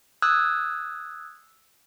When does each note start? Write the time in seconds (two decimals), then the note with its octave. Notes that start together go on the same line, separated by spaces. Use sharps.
0.22 D#6 E6 F#6 G#6